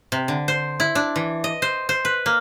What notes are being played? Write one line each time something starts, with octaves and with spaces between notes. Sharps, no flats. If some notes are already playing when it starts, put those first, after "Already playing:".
C3
D3
C5
E4
D4
E3
D#5
C5
C5
B4
A#3